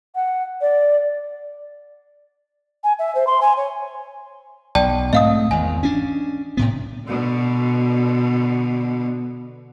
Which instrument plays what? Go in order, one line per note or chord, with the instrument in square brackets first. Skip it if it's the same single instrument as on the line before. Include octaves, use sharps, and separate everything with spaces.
[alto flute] F#5
D5
[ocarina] G#5
E5
C5
C6
G#5
C#5
[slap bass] B1 [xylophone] D5 G5 A5
[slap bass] G#2 A3 C4 [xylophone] D#5 F5 D#6
[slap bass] G#1 E2 [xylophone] G#5
[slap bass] C#4 D4
A2 C3 B3
[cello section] B2 D3